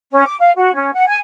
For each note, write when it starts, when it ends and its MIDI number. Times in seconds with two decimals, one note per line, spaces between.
0.11 0.23 61
0.26 0.36 86
0.40 0.51 77
0.57 0.71 66
0.74 0.91 61
0.94 1.07 78
1.07 1.17 80